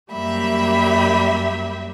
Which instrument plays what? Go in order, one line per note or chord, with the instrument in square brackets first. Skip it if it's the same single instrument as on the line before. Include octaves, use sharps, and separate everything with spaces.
[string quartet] F#2 G3 A#3 G4 E5 B5